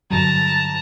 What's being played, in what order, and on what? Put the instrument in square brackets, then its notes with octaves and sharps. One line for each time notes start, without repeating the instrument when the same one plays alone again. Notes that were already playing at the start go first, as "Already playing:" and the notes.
[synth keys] G2 D3 F#3 [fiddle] A5 A#5